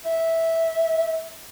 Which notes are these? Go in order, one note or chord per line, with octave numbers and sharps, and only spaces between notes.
E5